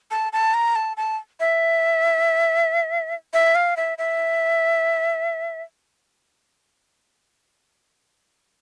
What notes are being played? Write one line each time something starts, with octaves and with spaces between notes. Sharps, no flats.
A5
A5
A#5
A5
A5
E5
E5
F5
E5
E5